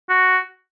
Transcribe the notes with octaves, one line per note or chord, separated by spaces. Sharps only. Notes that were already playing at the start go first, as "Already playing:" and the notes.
F#4